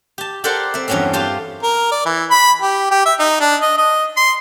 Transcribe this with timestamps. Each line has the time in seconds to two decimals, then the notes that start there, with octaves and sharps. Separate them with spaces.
0.18 G4 A5
0.44 G4 A4 A#4 C5 D5 F#5
0.74 C4 E5
0.88 E2 G2 F#3 C4 C#4 E5
1.13 F4 G4 C5 A5
1.63 A#4
1.92 D5
2.06 E3
2.31 B5
2.62 G4
2.91 G4
3.05 E5
3.19 D#4
3.40 D4
3.62 D#5
3.78 D#5
4.17 C6